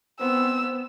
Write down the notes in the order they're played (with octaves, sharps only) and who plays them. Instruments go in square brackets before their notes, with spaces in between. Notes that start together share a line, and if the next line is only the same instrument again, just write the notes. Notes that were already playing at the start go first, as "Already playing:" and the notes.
[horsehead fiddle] B3 [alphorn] C4 [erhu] E6